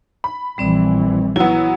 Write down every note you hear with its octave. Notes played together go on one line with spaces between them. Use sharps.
B5
A#1 E3 G3 C4 D5
F#3 B3 E4